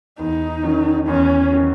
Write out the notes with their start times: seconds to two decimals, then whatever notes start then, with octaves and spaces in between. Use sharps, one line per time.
0.19 E2 D#4
0.63 D#3 F#3 C#4
1.07 E2 C#4
1.52 D#3 F#3 C#4